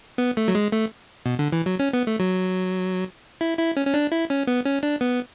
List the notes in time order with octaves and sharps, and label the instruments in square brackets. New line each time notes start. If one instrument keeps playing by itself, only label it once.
[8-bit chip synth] B3
A3
F#3
G#3
A3
B2
D3
E3
F#3
C#4
B3
A3
F#3
E4
E4
C#4
C#4
D4
E4
C#4
B3
C#4
D4
B3